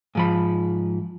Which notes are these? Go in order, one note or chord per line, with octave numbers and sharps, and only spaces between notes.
G#2 F3 B5